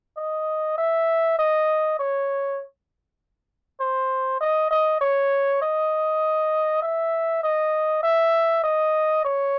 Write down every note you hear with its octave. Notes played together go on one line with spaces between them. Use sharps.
D#5
E5
D#5
C#5
C5
D#5
D#5
C#5
D#5
E5
D#5
E5
D#5
C#5